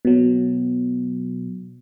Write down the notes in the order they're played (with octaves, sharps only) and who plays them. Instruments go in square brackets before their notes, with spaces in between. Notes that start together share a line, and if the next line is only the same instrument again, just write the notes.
[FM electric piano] B2 F#3